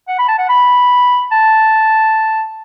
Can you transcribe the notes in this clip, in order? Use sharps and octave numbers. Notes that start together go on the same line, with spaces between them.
F#5
B5
A5
F#5
B5
A5